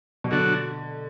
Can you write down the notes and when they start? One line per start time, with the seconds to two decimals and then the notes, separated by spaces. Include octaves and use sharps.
0.24 B2
0.31 D3 F#3 D4 F#4